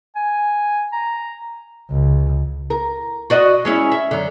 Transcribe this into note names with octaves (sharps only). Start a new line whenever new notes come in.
G#5
A#5
C#2
A#4
F#4 D5 D#5
G#3 C#4 E4
E5
F#2 D3